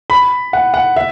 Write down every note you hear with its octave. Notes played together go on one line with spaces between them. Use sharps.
B5
F#5
F#5
E5